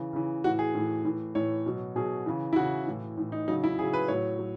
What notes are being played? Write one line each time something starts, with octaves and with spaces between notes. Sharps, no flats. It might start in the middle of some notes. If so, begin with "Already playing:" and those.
Already playing: C#3 E3
C#3 E3
A2 E3 F#4
G#4
A2 E3
A2 E3
A2 E3 C#5
B2 F#3
B2 F#3 G#4
C#3 E3
E4
C#3 E3 F#4
A2 E3
A2 E3
D#4
C#3 F#3 D#4
E4
C#3 F#3 G#4
B4
A2 F#3 C#5
F#3